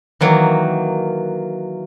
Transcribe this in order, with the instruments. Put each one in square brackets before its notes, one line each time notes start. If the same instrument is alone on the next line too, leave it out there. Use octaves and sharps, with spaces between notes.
[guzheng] D#3 E3 F#3 A#3